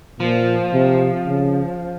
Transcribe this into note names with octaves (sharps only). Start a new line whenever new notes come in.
A#2 F3
C3
C#3